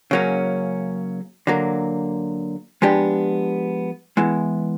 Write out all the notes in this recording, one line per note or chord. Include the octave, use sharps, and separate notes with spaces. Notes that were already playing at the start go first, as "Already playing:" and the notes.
C#3 F#3 A#3 C#4
D3 F#3 A#3
F3 G#3 B3 D4 G4
E3 G#3 B3 E4